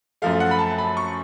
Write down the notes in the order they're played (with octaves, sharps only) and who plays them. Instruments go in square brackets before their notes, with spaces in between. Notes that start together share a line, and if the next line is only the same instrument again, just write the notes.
[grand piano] F#2 F3 A3 F5
F#5
B5
A5
B5
C#6